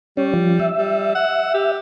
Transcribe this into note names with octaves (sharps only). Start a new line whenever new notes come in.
G3 C#4
F3
E5
G3
F#5
G4